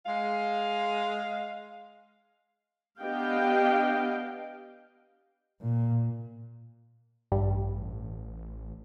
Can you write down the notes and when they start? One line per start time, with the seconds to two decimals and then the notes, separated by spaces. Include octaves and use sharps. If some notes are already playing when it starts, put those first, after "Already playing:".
0.06 G#3 F5
3.01 B3 D4 G4 D#5 F5 G5
5.61 A#2
7.32 A1 G2